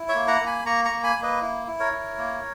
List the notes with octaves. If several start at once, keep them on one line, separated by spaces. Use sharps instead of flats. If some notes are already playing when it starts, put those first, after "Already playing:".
Already playing: E4
C#5 E5
A#3
F#5 A#5
A#3
G#5 B5
A#3 A#5 C#6
A#5 C#6
A#3
G#5 B5
A#3
B4 D#5
E4
E4
A#4 C#5
E4
A#3